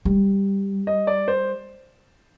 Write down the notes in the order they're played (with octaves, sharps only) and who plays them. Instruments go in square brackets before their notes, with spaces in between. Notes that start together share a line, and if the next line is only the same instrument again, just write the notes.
[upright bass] G3
[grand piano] D#5
D5
C5